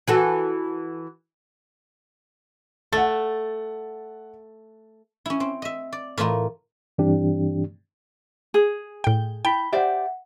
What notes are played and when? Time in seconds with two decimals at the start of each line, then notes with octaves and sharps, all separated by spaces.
0.08 E3 F#4 A4
2.92 A3 F#5 A6
5.26 C#4 E4
5.40 C4
5.62 D#5 E5
5.92 D5
6.17 A2 E3 E4 F4 A#4 D#5
6.98 G2 E3 C4 D4 G4
8.54 G#4
9.04 A2 G5
9.45 E4 G5 B5 B6
9.72 G4 C5 D5 E5 F#5